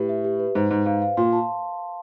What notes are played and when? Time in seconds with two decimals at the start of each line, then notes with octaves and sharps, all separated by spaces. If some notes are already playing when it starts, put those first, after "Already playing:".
Already playing: A2 G4 B4
0.09 E5
0.24 G4
0.40 B4
0.55 G#2 C5
0.71 G#2 C5
0.86 G#2 F5
1.02 F5
1.17 A#2 C6
1.33 A5